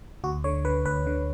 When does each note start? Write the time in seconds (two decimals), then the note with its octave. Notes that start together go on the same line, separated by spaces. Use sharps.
0.24 D2 F#4
0.44 D3 C#5
0.65 D3 B4
0.86 D2 B4
1.07 D3